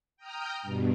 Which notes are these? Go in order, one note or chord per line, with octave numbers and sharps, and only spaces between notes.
G5 A#5 D#6 F6 G6
G2 B2